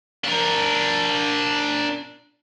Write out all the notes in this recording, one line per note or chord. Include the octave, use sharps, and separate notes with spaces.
D4 A#4